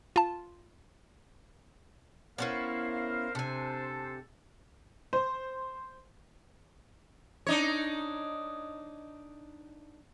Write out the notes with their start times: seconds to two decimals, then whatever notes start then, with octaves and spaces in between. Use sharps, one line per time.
0.16 F4 A5
2.38 B3 C#4 E4 A#4 C5 F5
3.35 C3 D4 A4 C5 G#5
5.13 C5
7.47 D4 D#4 C#5